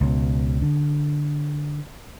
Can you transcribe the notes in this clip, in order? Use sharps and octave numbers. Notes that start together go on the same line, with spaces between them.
C#2 B2
D3